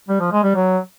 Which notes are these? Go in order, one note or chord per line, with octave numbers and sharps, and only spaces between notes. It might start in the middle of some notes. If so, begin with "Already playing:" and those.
G3
F3
G#3
G3
F#3